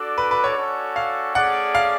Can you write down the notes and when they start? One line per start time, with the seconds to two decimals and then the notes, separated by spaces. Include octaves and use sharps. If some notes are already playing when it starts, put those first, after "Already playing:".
Already playing: D4 F#4 A4 D5
0.18 B4
0.31 B4
0.44 C#5
0.57 C#4 F#4 A4 D5
0.96 F5
1.35 A3 C#4 G#4 D5 F#5
1.75 F5